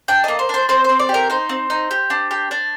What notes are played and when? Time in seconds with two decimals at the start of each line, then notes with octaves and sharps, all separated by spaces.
0.08 D4 G5
0.24 A#3 D#5
0.39 C5
0.49 D4 C5
0.69 C4 C5
0.84 C4 C5
0.99 D5
1.09 G4
1.14 A#4
1.30 D#4 C5
1.49 C4
1.70 D#4
1.91 G4
2.10 D4
2.31 G4
2.51 D4